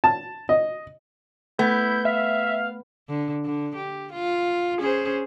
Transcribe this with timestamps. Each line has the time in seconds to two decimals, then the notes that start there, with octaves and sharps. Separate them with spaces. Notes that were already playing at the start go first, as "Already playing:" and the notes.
0.04 A5
0.49 D#5
1.59 A3 B3 E4 G6
2.05 E5 F5
3.09 D3
3.44 D3
3.75 G4
4.12 F4
4.79 C#4 G#4 C5